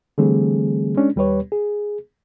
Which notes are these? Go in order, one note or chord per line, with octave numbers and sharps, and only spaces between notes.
D3 E3 G3 A3 C4 G#4
G#3 C#4 D4
D#2 G3 G4 B4 C#5
G#4